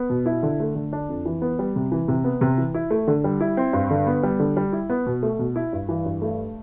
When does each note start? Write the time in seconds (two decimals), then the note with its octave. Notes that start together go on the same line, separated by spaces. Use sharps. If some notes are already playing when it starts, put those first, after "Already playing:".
Already playing: B3
0.10 B2
0.26 E4
0.43 D3
0.60 A3
0.75 D3
0.93 D4
1.09 F2
1.25 E3
1.42 B3
1.59 G3
1.76 C3
1.92 E3
2.08 C3
2.24 B3
2.41 C3
2.58 E3
2.74 E4
2.91 A3
3.07 D3
3.24 G3
3.40 E4
3.57 C4
3.73 G2
3.90 D3
4.07 B3
4.23 G3
4.39 D3
4.57 G3
4.73 E4
4.90 B3
5.06 B2
5.23 A3
5.39 B2
5.56 E4
5.73 G2
5.89 E3
6.05 G2
6.22 A3